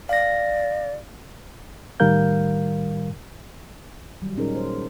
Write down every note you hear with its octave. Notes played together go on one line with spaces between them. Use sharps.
D5 F5 A#6
A2 D#3 G3 A#4 F5 G6
D#3 F#3 G3
A#2 G#3 C#4 D#4 G#4 A#4
C5